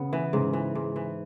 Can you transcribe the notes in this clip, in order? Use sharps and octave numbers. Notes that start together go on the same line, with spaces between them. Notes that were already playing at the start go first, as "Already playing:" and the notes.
Already playing: C#3 B3
E3
G#2 C#3
E3
G#2
E3